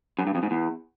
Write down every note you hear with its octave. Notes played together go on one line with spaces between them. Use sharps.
F#2
G2
F2
G#2
E2